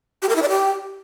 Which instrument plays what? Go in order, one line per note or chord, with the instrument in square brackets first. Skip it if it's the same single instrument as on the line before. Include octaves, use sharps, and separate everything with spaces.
[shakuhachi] G4
A#4
E4
D5
G4